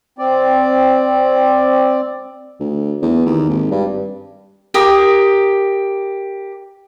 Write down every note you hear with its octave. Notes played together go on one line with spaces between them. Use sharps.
C4 D5
D2
E2
D#2
G#1
G2
G4 A#4 D#6